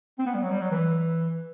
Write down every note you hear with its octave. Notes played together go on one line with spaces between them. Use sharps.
C4
B3
G3
F#3
G3
F#3
E3